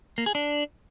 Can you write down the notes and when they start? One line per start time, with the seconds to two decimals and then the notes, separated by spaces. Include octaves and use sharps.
0.18 A#3
0.26 G#4
0.35 D4